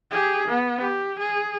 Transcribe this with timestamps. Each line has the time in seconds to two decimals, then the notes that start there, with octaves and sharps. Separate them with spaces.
0.11 G4 G#4
0.48 B3
0.81 G4
1.19 G#4